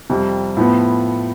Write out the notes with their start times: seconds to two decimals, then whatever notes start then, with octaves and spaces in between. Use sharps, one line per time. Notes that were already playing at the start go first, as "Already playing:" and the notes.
0.09 F2 C3 G3
0.57 A2 F3 B3